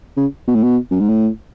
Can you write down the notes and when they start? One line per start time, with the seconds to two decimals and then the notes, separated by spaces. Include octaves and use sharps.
0.17 C#3
0.48 B2
0.55 A2
0.63 B2
0.91 F#2
1.00 G#2
1.09 A2